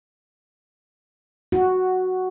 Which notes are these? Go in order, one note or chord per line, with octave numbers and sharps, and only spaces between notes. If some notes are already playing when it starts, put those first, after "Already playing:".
F#4